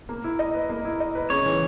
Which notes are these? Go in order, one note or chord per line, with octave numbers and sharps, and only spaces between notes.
A#3
E4
D#5
B4
A#3
E4
D#5
B4
C#3 C#5
E3